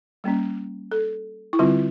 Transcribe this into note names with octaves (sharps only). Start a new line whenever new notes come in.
G3 A#3 C#4
A4
E4
D3 G3 C4 F4